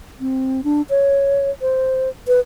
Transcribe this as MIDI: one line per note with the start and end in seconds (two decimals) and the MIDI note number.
0.20 0.61 60
0.64 0.82 62
0.90 1.50 73
1.61 2.09 72
2.28 2.40 71